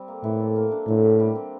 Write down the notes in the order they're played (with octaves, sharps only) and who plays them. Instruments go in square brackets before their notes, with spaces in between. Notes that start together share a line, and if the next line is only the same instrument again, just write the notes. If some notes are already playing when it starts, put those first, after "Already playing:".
Already playing: [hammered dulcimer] G3 C4
A#3
[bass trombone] A2 [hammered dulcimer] E3
[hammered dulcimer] A4
A#3
D4
[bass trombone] A2 [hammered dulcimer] D3
[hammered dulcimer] G4
G3
C4